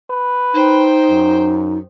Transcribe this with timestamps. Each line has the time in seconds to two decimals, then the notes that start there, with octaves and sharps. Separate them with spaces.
0.10 B4
0.54 D#4 C5 G5
1.10 F#2